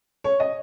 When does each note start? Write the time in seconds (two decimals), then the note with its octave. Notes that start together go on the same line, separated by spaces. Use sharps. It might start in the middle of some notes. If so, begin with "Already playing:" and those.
0.24 C#5
0.40 D#5